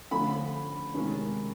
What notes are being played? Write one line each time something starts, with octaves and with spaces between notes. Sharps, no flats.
D3 F3 A3 C#4 B5
C3 D#3 G#3 C#4